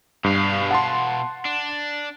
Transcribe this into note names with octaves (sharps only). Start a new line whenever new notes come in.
G2 B2 F5
F#5 A5 C6
D4